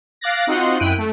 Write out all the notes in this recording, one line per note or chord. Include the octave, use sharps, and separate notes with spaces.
F5 D6 F#6 A6 A#6
C4 D#4 F4 F#4 F#5 C6
F#2 E4 G5 F#6 D7 D#7
A3